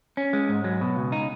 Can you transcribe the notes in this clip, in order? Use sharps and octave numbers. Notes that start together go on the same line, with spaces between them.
C#4
G#3
G#2
F#3
B2
C#2
D#4